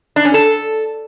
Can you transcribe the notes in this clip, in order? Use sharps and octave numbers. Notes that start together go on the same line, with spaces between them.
D4
C#4
A4